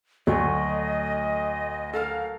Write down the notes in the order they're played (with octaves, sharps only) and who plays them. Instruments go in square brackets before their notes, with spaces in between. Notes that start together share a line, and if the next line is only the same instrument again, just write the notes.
[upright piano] D2 [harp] F#3 A3 [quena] D#5
[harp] A4 A#4 [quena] F5